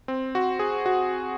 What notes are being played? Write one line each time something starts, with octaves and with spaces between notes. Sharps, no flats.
C4
F#4
G#4
F#4